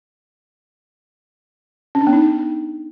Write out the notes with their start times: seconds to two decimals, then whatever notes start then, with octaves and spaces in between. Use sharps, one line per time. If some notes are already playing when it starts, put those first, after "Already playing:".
1.95 C#4
2.01 D4
2.07 B3
2.13 D#4